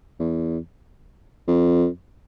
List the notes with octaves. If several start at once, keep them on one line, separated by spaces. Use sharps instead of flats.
E2
F2